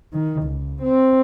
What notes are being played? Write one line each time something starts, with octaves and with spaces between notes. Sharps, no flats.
D#3
C#2
C4